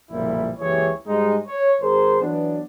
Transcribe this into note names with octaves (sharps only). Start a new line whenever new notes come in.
F#1 B1 A#2 F3 G3 E4
F#1 C#2 E3 G4 G#4 C#5
G#2 G3 G#3 D#4
C#5
G#1 G#4 A#4 C5
E3 F#3 B3 D4